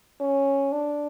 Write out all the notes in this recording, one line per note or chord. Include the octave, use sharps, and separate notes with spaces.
C#4
D4